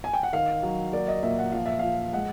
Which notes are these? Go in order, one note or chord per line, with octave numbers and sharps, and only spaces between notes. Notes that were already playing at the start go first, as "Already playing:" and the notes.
G#5
G5
F#5
D#3 F5
F#3
A#3 D5
D#5
A#2 E5
F#5
F3 F5
E5
F3 F5
G#3 F#5